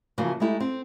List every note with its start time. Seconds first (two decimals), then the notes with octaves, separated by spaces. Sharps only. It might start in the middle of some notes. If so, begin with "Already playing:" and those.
0.18 C#3 E3 F3 A#3 F#4 B4
0.40 G#3 A3 D#4 E4 G4
0.60 C4